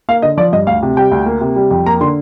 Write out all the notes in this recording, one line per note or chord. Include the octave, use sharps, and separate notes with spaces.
A#3 F5
D3 D#5
F3 D5
G2 D#5
D2 F5
C3
G3 G5
D2
A#3
C3
G3
F2
A#3 A#5
D3 C6